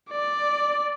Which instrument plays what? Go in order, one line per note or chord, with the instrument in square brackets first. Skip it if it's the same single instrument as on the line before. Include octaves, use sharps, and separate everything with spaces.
[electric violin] D5